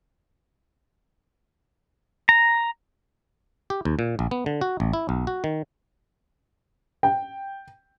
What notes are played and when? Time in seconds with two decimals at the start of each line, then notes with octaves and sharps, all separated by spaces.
2.29 A#5
3.70 G4
3.85 D#2
3.99 A#2
4.19 A#1
4.31 B3
4.46 D3
4.61 F#4
4.80 A1
4.93 E4
5.09 B1
5.27 F#4
5.44 D#3
7.03 G5